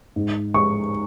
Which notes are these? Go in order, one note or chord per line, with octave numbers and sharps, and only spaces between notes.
G#2
G#3 C#6